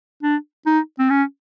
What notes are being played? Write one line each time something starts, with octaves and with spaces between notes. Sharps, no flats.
D4
D#4
C4
C#4